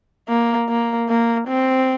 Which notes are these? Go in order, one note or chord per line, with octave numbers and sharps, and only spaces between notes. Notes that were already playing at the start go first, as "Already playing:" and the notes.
A#3
A#3
A#3
C4